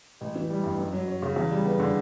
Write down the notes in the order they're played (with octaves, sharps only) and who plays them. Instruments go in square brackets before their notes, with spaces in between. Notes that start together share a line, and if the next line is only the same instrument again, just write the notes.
[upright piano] A1
E3
G3
G2
F#2
F#3
C#4
C#3
E2
G3
B3
D3